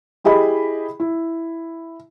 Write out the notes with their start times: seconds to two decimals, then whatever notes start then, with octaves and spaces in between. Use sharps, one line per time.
0.24 E4 G4 G#4 D#5 B5
1.00 E4